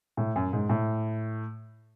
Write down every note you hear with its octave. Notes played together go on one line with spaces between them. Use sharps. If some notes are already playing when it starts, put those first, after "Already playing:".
A2
F#2
G#2
A2